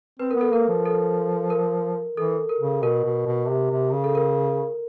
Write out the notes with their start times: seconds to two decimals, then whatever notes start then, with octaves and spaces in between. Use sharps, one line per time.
0.20 C4 B4
0.31 B3 A#4
0.41 A4
0.52 A#3 A#4
0.69 F3
0.85 A4
1.50 A#4
2.17 E3 A4
2.49 A#4
2.61 C#3
2.83 B2 A#4
3.04 B2
3.27 B2
3.49 C3
3.71 C3
3.92 C#3
4.04 A4
4.15 A#4